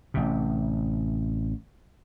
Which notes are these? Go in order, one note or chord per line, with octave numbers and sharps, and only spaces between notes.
A1 C3